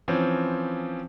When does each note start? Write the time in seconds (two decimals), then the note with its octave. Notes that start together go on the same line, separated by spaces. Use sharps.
0.08 E3 F3 C4 C#4